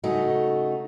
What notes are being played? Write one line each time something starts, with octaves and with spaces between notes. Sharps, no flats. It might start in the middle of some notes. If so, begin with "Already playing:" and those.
C#3 A3 D#4 F#4